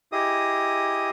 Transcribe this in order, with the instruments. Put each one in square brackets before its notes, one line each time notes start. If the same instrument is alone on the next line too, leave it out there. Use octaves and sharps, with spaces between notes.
[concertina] E4 G4 G#4 D#5 D#6